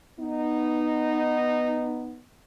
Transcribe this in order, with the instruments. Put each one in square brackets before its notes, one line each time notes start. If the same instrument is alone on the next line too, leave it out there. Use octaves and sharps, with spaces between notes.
[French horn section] B3 D#4